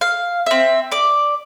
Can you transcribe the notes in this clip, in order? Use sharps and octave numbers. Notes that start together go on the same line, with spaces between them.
F5
C4 E5
D5 D6